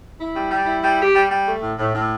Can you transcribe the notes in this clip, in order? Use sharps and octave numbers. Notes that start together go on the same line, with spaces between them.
E4
G3
G3
E4
G3
G4
G3
G3
A3
A2
A2
A2